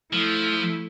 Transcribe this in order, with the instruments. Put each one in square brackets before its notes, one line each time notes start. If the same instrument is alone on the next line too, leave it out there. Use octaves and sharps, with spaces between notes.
[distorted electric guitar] F3 [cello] A3 E4